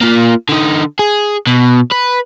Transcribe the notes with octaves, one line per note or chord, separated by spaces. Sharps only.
A#3 F4
D3 D#4
G#4
B2
B4